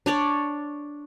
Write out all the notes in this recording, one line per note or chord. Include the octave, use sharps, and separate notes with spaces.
D4 C#5 D5